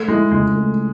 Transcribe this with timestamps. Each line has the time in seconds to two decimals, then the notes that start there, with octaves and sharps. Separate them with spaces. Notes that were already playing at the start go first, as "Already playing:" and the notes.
Already playing: A3
0.08 G#3 E4
0.32 C#2 G#3
0.55 A3